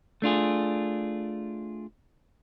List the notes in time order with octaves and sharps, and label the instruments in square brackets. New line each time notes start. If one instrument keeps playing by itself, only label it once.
[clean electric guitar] A3 D4 F4 G#4